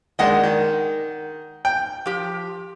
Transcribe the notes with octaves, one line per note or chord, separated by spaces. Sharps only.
D#3 G#3 D4 D#5 F#5
D#3
G5
F3 G4